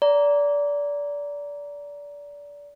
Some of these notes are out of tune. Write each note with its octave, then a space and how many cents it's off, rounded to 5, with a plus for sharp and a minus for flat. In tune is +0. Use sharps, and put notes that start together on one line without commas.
D5 -25 A#5 +0